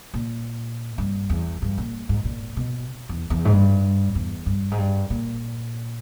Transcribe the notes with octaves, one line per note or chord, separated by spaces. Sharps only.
A#2
G2
E2
G2
A#2
G#2
A#2
B2
E2
E2
G#2
G2
E2
G2
G#2
G2
A#2